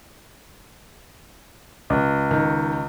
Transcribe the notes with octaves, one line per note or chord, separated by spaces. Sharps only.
C#2
D#3